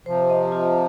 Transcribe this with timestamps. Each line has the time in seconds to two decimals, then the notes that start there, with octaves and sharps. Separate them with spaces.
0.06 C3 F3 C5
0.30 D#5
0.52 F4